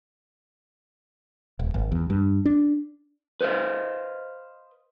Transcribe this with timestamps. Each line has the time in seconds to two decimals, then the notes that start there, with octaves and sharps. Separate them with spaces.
1.59 D#1
1.74 G#1
1.92 E2
2.10 G2
2.45 D4
3.41 B4 C5 D#5 F5